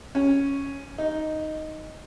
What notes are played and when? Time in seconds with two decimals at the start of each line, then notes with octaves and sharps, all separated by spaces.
0.15 C#4
0.98 D#4